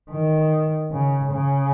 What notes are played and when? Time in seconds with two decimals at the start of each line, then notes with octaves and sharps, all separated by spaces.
0.11 D#3
0.92 C#3
1.32 C#3